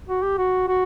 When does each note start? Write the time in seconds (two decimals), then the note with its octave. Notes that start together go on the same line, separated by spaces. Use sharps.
0.08 F#4
0.22 G4
0.38 F#4
0.68 F#4